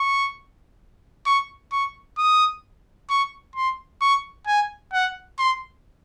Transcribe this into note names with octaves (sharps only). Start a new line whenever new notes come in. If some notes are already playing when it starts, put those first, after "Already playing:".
Already playing: C#6
C#6
C#6
D#6
C#6
C6
C#6
G#5
F#5
C6